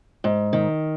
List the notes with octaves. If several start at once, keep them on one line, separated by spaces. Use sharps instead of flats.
G#2
D#3